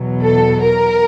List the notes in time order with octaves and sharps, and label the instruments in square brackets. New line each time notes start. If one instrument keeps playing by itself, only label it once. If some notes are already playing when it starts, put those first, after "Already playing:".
Already playing: [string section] E2 B2 F#3
A4
A#4